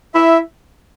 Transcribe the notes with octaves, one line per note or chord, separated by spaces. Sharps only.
E4 E5